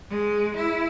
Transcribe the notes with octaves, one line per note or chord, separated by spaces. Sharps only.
G#3
E4